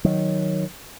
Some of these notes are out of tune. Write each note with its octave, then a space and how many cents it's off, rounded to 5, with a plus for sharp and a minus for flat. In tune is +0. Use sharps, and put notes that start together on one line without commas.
D#3 +0 F#3 +0